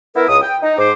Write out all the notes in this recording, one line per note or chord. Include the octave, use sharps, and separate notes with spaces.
B3 E4 A#4
C#2 D#6
G5
D#4
G#2 C5 D6